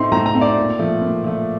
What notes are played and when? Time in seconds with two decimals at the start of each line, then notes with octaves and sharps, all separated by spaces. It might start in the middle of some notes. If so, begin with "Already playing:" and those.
Already playing: A2 A3 C4 D#4 C6
0.12 A2 A#5
0.26 A#5
0.34 A3 C4 D#4
0.41 D5
0.57 A#2
0.79 F3 A3
1.02 A#2
1.24 F3 A3